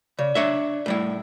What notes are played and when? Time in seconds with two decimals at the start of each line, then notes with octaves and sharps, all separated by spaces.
0.19 C#3 D5
0.35 D4 C#5 E5
0.86 A2 G3 E4